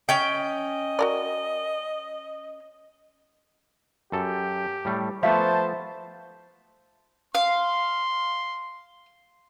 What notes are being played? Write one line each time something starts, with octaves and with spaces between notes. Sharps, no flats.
C#4 D#5 G5
F#4 A#4 D5
F#2 G4 A4
A2 G3 A3
F3 A3 B3 C5 E5 F5 A5
F5 C6